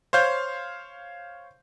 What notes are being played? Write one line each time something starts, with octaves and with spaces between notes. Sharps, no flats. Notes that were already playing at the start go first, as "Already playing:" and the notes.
C5 C#5 F5 G6